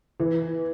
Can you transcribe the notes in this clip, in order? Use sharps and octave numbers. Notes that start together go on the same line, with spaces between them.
E3